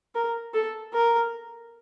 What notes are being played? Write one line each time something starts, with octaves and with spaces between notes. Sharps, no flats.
A#4
A4
A#4